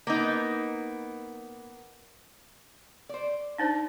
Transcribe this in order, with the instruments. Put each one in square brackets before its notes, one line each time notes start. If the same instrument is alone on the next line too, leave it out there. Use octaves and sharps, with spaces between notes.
[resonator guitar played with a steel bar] A#3 B3 D#4
C5 D5
[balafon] D4 D#4 C5